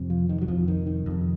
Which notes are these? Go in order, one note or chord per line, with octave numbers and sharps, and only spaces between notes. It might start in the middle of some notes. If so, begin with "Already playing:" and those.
Already playing: F2 C3
F3
D#3
F#3
F2 C3 F3
D#3
D#3
F2 C3